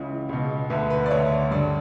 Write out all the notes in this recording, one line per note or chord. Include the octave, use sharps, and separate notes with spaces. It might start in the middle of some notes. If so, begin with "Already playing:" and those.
Already playing: C#2 C#3 E3
C#2 B2
D2 D3 B4
B4
D5
D2 D3 C#5
G2 D3 D5